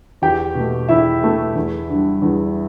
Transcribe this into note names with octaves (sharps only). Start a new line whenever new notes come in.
E2 G4 G5
B2 A3
E2 E4 E5
B2 A3
E2
D3 G3
E2